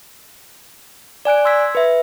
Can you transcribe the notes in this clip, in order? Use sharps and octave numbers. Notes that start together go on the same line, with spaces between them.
D5 G#5 F#6 D7
C6 E6 G#6 B6
B4 E5